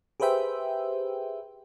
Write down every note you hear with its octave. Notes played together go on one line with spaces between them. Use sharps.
G4 G#4 B4 C5 E5 G5